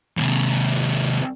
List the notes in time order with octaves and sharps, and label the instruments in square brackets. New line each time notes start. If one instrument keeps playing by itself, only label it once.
[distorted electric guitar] D#2 C3